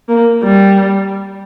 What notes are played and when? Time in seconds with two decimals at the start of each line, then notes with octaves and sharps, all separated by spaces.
0.09 A#3
0.44 G3